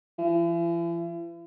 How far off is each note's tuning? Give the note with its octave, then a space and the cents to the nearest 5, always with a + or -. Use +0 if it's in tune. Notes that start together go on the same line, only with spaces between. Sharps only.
E3 +45